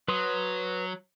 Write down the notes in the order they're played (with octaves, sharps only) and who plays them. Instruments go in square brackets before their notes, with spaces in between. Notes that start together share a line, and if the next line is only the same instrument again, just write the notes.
[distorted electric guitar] F#3 [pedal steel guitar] B4 C6 D#6